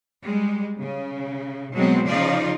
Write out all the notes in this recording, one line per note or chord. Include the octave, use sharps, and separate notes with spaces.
G3 G#3
C#3
B2 F#3 G#3 B3 C4
C#3 F3 D#4 F4 D5